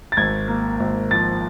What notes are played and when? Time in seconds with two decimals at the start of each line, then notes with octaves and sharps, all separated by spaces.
0.12 A6
0.17 G#1 G#6
0.48 A#3
0.80 G#1
1.11 F3 A6